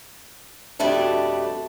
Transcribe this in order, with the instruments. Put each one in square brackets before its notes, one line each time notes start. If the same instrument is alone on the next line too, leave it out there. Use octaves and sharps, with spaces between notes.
[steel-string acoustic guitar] F2 B2 G3 A3 D4